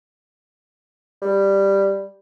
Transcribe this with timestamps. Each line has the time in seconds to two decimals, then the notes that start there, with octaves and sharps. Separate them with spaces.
1.22 G3